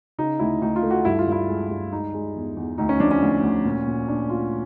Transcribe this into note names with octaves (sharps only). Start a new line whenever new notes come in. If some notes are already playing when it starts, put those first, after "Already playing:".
C#3 D#4
D2 E4
D2 D#4
F4
A3
F#4
G2 E4
F4
G2 E4
G#3
G2
G#3 D#4
G#3
E2
E2
D2 D#4
C#4
F3 D4
C#4
D2
D2
A#2
A#2
A#2 D4
A#2 F4